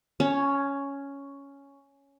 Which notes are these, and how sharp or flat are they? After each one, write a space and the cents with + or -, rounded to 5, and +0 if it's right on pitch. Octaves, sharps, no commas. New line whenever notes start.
C#4 +5 C#5 +0 G#5 +45